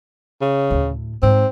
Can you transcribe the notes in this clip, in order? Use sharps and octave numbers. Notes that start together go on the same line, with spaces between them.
C#3
D2 A2
G#2 C4